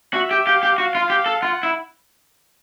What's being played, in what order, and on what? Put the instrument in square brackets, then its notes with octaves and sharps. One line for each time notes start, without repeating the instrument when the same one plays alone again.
[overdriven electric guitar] F#4 [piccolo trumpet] E5
[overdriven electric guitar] G4
[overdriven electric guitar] G4 [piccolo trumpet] F5
[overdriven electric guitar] G4
[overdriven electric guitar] F#4 [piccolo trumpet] F5
[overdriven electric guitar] F4
G4
A4
[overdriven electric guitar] F4 [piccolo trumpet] F#5
[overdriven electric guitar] E4